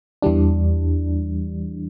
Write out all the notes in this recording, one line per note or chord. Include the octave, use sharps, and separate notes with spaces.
E2 E3 G3 D4